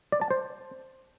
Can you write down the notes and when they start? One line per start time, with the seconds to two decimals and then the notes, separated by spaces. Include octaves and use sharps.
0.12 D5
0.21 A5
0.31 C5